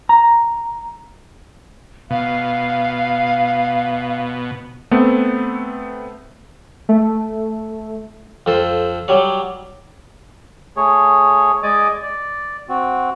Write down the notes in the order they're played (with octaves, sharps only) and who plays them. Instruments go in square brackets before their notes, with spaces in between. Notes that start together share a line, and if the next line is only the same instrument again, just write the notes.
[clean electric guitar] A#5
[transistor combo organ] B2 [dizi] F5
[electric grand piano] A3 B3 C4
[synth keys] A3
[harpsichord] F2 A4 C5
F#3 G3 C#5
[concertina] A3 G#4 C#5
G#3 D5 D#5 G#5 D6
D5
C4 F#4